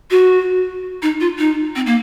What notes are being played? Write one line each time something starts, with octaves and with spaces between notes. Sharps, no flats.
F#4
D#4
F4
D#4
C4
A#3